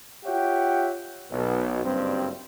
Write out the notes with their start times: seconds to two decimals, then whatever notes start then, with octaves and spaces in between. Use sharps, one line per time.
0.25 F4 G4 C#5 E5 F#5 G5
1.31 B1 B2
1.84 F#1 G2 G3 C4